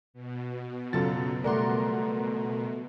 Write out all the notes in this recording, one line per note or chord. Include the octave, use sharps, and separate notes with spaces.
B2
F#2 C#3 F#3 F4 A4 A6
G3 A3 A#4 D5 F#5 C6